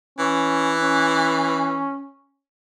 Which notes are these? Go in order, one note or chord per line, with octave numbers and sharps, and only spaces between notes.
E3 C#4
C#4